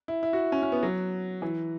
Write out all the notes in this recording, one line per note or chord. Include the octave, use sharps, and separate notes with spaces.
E4
E4
F#4
C#4
C#4
B3
F#3
E3